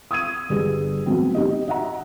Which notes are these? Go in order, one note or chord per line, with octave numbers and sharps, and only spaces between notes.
D#6 E6 G#6 D#7
G1 G3 G#4
A2 F#3 B3 C4
D#4 G4 D#5
D#5 E5 F#5 A#5